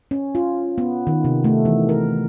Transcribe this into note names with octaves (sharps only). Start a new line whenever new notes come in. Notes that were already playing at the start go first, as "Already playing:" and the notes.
C#4
F4
B3
D#3
C3
A3
E3
A#4